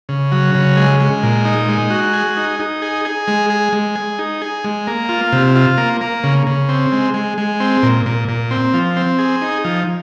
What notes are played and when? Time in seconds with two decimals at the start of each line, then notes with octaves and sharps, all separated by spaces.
0.09 C#3
0.32 F#3
0.55 C#3
0.77 G#3
1.00 G#3
1.23 A#2
1.45 D#4
1.68 G#3
1.90 F#4
2.13 G#4
2.37 D#4
2.59 D#4
2.82 G#4
3.05 G#4
3.28 G#3
3.50 G#4
3.73 G#3
3.96 G#4
4.19 D#4
4.42 G#4
4.64 G#3
4.87 A#3
5.09 F4
5.32 C3
5.56 F4
5.78 A#3
6.01 A#3
6.24 C#3
6.47 C#3
6.69 C4
6.92 G#3
7.14 G#3
7.38 G#3
7.60 C4
7.83 A#2
8.06 A#2
8.28 A#2
8.51 C4
8.74 F3
8.96 C4
9.19 G#4
9.41 D#4
9.65 F3